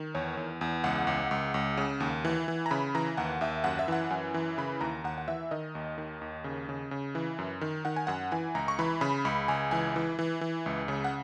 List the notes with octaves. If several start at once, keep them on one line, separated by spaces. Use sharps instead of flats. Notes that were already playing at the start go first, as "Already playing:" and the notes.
Already playing: D#3
E2 C#5
E2
E2
C#2 F#5
C#2
C#2
C#2
C#3
D#2
E3
E3
A#5
C#3 B5
E3 A#5
D#2 F#5
D#2 E5
F#2 F#5
E5
E3 F#5
F#2 G#5
E3
C#3 B5
D#2 A#5
D#2 F#5
F#5
E3 E5
D#3 D#5
D#2
D#3
D#2
C#3
C#3
C#3
E3
F#2
D#3
D#3 F#5
G#5
F#2 F#5
E3 G#5
C#2 A#5
C#6
E3 B5
C#3 B5
C#2 B5
C#2 G#5
E3 G#5
E3
E3
E3
C#2
C#3
F#5